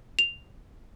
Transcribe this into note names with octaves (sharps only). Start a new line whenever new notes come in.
F7